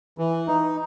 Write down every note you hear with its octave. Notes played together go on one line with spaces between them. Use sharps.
E3
D#4